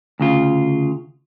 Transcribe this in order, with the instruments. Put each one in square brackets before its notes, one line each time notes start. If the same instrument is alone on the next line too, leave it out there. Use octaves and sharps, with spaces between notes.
[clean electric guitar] D2 C#3 F4